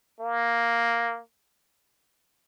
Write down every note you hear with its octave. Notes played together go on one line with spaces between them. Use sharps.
A#3